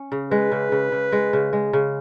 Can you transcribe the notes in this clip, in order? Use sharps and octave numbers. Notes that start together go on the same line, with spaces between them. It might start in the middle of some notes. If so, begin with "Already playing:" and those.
Already playing: C#4
C#3
G#3 B4
C#3
C#3
C#3
G#3
C#3
G#3
C#3